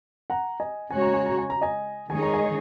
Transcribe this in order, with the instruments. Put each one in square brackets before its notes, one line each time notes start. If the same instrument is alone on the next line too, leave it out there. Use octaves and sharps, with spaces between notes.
[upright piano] F#5 A#5
D#5 G#5
[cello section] C#3 G#3 F#4 C#5 [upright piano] G#5
[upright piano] A#5
G#5
A#5
G#5
A#5
D#5 G#5
[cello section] D#3 G#3 D#4 G#4 C#5 [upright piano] G#5
[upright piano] A#5
D#5 G#5